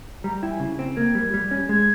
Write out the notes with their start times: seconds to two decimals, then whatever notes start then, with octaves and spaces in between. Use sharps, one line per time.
0.24 G3 A#5
0.42 E4 G5
0.51 G#5
0.60 C#3
0.79 C4
0.97 A#3 G#6
1.15 G3
1.34 G3
1.51 C#4
1.69 G#3 G#6